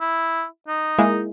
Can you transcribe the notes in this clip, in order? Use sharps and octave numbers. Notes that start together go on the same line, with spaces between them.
E4
D#4
G#3 A#3 E4